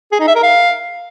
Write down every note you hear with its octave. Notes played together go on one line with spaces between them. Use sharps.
G#4
D#4
E5
A#4
F5